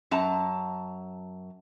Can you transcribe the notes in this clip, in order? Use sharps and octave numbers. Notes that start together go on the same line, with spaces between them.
F#2 A5 A#5